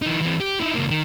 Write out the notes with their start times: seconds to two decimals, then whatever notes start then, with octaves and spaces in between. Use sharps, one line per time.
0.02 E3 D#4
0.21 E3 C4
0.41 G4
0.60 D#4 E4
0.75 C#2 A#3
0.90 D#3